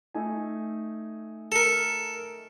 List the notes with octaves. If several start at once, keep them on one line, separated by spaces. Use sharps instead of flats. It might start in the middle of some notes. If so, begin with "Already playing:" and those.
A3 D#4 G#5
A4 A#4